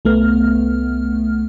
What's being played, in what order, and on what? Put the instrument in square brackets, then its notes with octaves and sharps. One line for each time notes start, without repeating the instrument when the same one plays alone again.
[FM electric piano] C2 A3 B3 F6